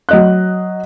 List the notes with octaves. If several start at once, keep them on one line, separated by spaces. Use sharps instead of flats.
F#3 D#5 F#6